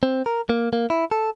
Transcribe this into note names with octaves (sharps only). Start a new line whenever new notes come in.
C4
A#4
A#3
A#3
E4
A4